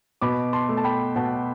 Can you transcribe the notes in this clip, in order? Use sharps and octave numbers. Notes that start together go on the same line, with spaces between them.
B2 B5 D6
A5 C6
A3
A5
G5 B5
B2 F#5 A5